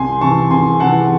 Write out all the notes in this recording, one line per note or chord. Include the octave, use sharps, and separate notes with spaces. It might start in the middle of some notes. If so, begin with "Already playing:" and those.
Already playing: C2 G#5 C6
C3 E3 A5 C#6
C2 G#5 C6
C3 E3 F#5 A5